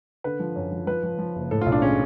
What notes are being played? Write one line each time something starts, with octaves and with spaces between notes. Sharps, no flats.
D3 B4
F3
F#2
F3
F3 B4
F3
F3
F#1
A2 A4
B1 F4
D4
G#3 C#4